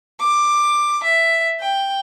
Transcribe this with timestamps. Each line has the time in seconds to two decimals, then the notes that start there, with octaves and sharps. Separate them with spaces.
0.20 D6
1.03 E5
1.60 G5